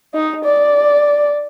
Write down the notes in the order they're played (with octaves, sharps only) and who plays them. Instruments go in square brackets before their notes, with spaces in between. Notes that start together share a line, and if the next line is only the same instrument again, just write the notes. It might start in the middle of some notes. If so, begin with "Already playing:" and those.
[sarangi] D#4
D5